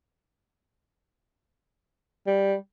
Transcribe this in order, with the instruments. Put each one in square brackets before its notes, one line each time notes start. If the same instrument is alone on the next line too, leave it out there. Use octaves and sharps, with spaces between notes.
[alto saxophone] G3